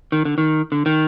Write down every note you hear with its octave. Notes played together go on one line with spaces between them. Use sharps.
D#3
D3
D#3
D3
D#3